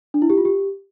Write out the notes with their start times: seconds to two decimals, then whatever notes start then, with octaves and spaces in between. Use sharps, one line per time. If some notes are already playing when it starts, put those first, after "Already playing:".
0.14 D4
0.22 E4
0.30 G4
0.37 F4
0.45 G4